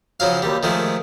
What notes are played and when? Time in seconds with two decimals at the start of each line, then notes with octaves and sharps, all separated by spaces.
0.20 C#3 F3 F#3 F5
0.42 D#2 G3
0.63 D#3 F3 G#3 A3